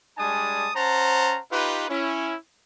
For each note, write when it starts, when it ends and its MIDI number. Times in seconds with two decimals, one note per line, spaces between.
0.18 0.70 55
0.18 0.70 56
0.18 0.70 62
0.18 0.70 80
0.18 0.70 81
0.18 0.70 87
0.75 1.40 61
0.75 1.40 72
0.75 1.40 78
0.75 1.40 81
0.75 1.40 82
1.52 1.87 63
1.52 1.87 65
1.52 1.87 67
1.52 1.87 71
1.89 2.36 61
1.89 2.36 64